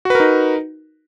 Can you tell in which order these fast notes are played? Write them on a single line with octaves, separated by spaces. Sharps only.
F#4 B4 A#4 D#4